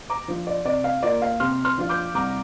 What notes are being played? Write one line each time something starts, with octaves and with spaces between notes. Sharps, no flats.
A#5 D6
F3 D4 F4
D5
C3 D5
F5
A#3 F4 D5
F5
C3 C6 F6
C6 F6
F3 D4 F4
D6 G6
C2 A#5 D6